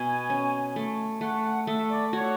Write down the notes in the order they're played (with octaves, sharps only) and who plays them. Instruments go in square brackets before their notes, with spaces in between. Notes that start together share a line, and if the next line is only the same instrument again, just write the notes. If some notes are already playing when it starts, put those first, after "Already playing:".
Already playing: [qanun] B2 [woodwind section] G#5
[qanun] C#4
A3
[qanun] A3 [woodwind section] F#5
[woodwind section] F#5
[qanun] A3 [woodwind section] E5
[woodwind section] D5
[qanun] F#4 [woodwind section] C#5